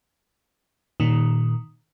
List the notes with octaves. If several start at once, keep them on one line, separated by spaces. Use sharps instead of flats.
A#2 D#3